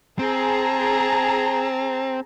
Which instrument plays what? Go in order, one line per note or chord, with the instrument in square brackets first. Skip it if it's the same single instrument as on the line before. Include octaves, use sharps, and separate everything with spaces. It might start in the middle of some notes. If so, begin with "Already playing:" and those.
[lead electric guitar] C4 [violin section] G#4 A5 A#5